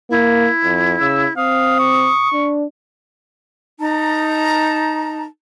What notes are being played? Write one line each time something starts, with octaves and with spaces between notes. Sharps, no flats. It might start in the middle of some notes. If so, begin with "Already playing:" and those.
A#3 E4
F2
C#3 E6
C4 F5 D#6
C#6
D4
D#4 A5 A#5